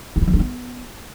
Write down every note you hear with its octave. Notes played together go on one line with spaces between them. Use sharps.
D#4
E4
F3
D4
B3